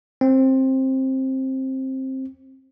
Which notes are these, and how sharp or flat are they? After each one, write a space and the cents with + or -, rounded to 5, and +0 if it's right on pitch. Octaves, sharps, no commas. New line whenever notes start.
C4 +15